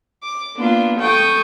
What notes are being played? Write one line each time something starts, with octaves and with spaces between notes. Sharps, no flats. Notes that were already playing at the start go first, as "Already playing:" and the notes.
D6
A#3 B3 D4 F4
A4 G5 C#6 D#6